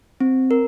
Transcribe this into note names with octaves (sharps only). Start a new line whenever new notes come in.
C4
A#4